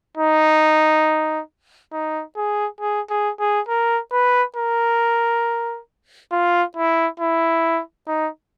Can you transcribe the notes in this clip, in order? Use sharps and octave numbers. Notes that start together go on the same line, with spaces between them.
D#4
D#4
G#4
G#4
G#4
G#4
A#4
B4
A#4
F4
E4
E4
D#4